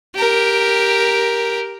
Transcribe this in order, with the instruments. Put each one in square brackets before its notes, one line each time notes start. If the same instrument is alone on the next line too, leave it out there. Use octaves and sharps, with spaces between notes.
[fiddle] G4 A#4